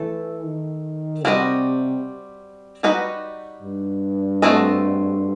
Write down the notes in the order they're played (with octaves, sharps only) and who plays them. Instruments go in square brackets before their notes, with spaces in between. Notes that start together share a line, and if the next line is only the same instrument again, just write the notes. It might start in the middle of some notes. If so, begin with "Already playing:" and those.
Already playing: [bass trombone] E3 [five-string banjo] A3 A4
[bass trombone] D#3
[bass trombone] C3 [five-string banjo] G3 C4 F#4 B4 D#5
[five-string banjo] G3 D#4 F#4 B4 D#5
[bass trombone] G2
[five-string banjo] A3 C4 F#4 A4 D#5